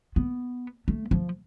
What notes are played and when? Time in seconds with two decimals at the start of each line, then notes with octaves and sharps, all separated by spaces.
0.16 B3
0.88 A3
1.11 F3